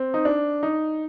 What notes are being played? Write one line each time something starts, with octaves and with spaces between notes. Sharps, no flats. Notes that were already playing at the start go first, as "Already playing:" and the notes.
Already playing: C4
D#4
D4
D#4